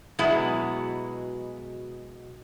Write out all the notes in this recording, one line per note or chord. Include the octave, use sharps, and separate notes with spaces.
B2 F#3 G#3 B3 E4 G#4